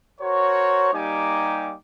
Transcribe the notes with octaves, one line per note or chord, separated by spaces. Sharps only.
F#4 A#4 C5 C#5
G3 A#3 D#4 G4 G#5 D6